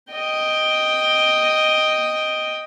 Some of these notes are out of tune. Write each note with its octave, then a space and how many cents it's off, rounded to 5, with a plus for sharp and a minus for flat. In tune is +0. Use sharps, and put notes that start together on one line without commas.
D#5 +0 G5 +5